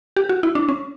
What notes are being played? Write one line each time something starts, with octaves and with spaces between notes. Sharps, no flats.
G4
F#4
E4
D4
C#4